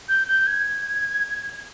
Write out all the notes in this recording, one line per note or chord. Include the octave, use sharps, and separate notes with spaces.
G6
G6
G#6